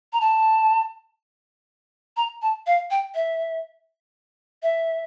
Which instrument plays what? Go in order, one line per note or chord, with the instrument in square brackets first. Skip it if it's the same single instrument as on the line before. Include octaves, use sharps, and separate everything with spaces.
[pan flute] A#5
A5
A#5
A5
F5
G5
E5
E5